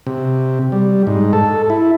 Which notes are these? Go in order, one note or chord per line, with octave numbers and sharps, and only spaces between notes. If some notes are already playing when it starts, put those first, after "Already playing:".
C3
G3
G#2
A4
E4